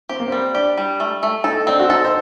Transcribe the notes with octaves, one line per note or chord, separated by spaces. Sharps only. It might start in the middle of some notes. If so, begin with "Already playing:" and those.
C4 G4
A#3
G3 C4
D4 G4
G3
A3
A3
D#4 A4
C4 D4
F#4
D#4 A4
C5